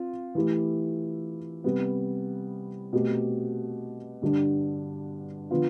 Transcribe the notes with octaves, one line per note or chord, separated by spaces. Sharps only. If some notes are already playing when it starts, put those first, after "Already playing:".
Already playing: C4 F4
E3 A3 E4 G4
C3 G3 B3
B2 A3 C4 G4
G2 D3 G3 D4
D3 F3 B3 F4